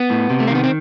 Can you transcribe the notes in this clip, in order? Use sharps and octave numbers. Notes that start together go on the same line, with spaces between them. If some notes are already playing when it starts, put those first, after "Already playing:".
Already playing: B3
A2
C3
A3
A#3
D#3 B3
C4